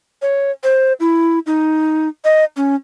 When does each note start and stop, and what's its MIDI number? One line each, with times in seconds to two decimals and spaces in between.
0.22 0.51 73
0.63 0.93 72
1.00 1.39 64
1.46 2.08 63
2.24 2.44 75
2.56 2.75 61